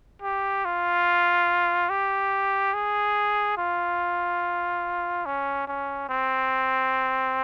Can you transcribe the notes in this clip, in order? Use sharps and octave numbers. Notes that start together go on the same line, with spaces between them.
G4
F4
G4
G#4
F4
C#4
C#4
C4